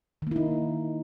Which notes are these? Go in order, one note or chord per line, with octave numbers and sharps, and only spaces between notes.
D#3 A#3 D#4 E4